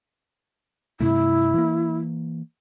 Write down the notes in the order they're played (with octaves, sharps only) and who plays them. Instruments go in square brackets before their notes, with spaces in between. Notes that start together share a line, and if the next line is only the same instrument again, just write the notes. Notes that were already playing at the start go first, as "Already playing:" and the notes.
[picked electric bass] G2 C3 A3 [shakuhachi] E4
[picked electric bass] E3 A#3